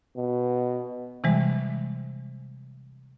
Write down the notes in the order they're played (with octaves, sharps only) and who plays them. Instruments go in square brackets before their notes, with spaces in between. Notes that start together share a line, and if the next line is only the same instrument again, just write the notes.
[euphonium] B2
[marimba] C3 E3 G3 G#3